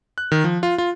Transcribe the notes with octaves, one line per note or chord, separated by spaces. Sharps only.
F#6
D#3
F3
F4
F4